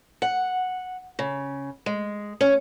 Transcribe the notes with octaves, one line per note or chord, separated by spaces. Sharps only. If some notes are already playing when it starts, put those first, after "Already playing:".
F#5
C#3
G#3
C#4